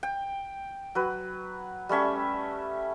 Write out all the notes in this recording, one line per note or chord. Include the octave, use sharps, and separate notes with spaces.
G5
F#3 B4
G3 A3 C#4 E5